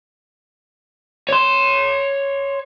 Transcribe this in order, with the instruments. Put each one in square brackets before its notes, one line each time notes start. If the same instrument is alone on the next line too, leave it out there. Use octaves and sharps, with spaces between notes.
[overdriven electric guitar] C#5 C6